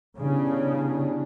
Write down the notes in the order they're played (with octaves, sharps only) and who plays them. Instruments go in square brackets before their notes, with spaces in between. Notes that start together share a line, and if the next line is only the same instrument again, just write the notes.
[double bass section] C#3 [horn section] E3 G3 B3 D4